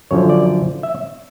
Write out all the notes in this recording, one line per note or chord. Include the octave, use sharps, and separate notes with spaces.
F#2 D3 F3 C#5
D5
E5